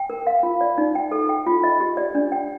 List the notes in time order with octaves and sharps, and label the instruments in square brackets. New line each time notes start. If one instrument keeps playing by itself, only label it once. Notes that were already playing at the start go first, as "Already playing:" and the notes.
Already playing: [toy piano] G5
A#4
F5
F4
D5
D#4
G5
A4
G5
F4
D#5
G4
D5
D4
G5